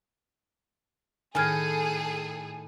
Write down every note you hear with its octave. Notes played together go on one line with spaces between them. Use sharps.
A2 D#3 G#4 A4 G#5 F6 G#6